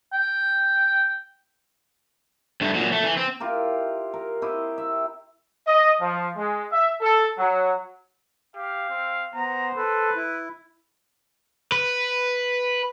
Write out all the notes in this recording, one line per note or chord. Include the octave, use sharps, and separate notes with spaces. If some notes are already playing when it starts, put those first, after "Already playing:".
G5
G2 A3
A#2 F#3
A3
E3
C4
E4 F4 G4 A#4
A#4
C4 E4 G4 D#5
E5
D#5
F3
G#3
E5
A4
F#3
G4 F5
C4
B3 C5 A#5
A4 B4
E4
B4